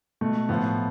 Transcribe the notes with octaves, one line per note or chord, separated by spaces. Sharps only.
B2 A3
A2 F3 B3